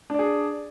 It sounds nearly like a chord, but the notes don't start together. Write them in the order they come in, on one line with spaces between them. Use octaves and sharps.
D4 D5 G#4